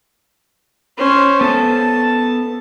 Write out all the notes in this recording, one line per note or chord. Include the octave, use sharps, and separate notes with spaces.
C#4 C5
B3 A4 A5